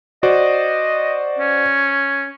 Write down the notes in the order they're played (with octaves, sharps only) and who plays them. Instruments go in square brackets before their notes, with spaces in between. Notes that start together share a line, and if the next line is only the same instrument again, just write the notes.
[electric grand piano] F#4 C5 D5 [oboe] D#5
[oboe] C#4